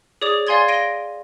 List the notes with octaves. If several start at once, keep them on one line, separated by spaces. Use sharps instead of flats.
G#4 C#5 D5 D6 D#6 F7
D5 F5 G#5 C6 G#6 A6
A#6 D7 D#7 G7